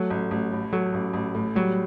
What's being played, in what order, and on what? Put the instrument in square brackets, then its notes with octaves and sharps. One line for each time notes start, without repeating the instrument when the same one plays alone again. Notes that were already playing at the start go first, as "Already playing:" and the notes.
Already playing: [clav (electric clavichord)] F#3 [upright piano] A3
[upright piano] A1
A1
A2
[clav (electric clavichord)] F#3 [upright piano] A3
[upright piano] A1
A1
A2
[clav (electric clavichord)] F#3 [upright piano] G3